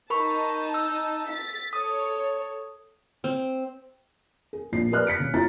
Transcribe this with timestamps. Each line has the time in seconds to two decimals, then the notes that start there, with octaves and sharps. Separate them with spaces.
0.10 D#4 A#4 A5 B5 C#6
0.74 E6
1.29 A6 B6
1.73 A4 C#5 D#6
3.24 C4
4.53 G#4
4.72 A#1 C7
4.91 G4 A#4 B4 D5 F6 F#6
5.07 B6 C#7 D7
5.20 C#3
5.34 E4 F4 G4 A#5 A6